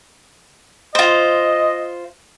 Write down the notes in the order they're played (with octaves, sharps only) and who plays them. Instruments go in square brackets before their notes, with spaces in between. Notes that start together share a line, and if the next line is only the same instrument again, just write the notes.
[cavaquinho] F4 C5 [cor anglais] D#5